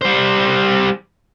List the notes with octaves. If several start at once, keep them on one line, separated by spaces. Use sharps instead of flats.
G3 C5